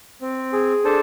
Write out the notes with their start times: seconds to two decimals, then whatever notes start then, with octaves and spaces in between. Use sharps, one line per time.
0.21 C4
0.53 G#4
0.85 D4 A4 C5